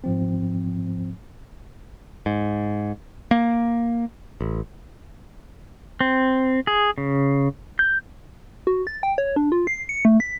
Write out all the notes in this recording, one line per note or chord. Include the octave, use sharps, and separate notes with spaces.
G#2 F3 C4
G#2
A#3
A1
C4
G#4
C#3
G6
F#4
A6
G5
C#5
D4
F4
C7
C#7
A3
B6